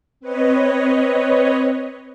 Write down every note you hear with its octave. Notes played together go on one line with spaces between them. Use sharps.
C4 B4 C#5 D#5